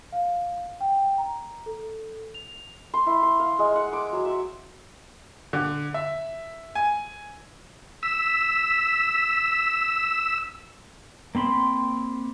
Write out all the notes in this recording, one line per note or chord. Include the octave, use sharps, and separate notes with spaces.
F5
G5
A#5
A4
F7
C6
E4
C6
F5
G#3
F#5
D6
F#3
E5
D3
E5
G#5
E6 B6
A#3 C4 B5 C6